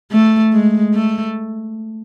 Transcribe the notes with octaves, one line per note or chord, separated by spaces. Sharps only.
A3
G#3
A3